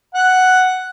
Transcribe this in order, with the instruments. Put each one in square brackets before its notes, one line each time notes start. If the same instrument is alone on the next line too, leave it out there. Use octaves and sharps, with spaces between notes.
[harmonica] F#5